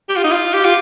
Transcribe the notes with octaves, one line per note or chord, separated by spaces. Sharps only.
G4
F4
D#4
F4
G4
F4